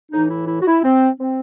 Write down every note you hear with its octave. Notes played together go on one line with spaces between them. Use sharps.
A2 E3 D#4
E4
E4
F#4
E4
C4
C4